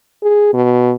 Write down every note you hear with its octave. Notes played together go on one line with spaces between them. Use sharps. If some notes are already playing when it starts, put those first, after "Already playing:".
G#4
B2